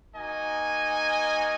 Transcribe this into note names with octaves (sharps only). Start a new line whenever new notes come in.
A#3 D#4 F#4 D#5 G#5